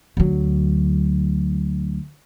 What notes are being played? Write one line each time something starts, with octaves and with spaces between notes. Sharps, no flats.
D2 F#3